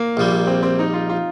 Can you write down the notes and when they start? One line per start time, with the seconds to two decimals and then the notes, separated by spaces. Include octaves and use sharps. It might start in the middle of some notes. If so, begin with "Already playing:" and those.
Already playing: A#3
0.17 A#1 A#2 G3
0.47 C4
0.63 C4
0.79 D#4
0.94 F4
1.10 F4